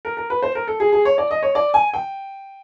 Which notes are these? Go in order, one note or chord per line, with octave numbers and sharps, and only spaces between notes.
A#4
A#4
B4
C5
A#4
A4
G#4
G#4
C#5
D5
D#5
C#5
D5
G#5
G5